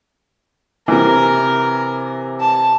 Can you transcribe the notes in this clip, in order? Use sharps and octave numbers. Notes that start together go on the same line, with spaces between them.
C3 E3 A#4
A5